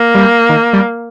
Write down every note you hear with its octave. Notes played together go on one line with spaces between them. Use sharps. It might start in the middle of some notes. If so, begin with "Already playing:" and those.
Already playing: A#3
G3
D#3
G3